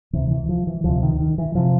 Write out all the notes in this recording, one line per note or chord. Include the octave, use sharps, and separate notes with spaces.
D2 C3 E3
E3
F3
E3
D2 C3 F3
D#3
D#3
E3
C3 F3